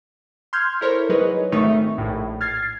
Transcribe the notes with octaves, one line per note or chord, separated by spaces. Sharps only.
C6 F6 G6 G#6
E4 A4 A#4 C5 C#5
F#3 D#4 G#4 B4 C#5 D#5
G#1 D#3 A3 D#4 E5 C#6
A#1 A2
F6 G#6 A6 C7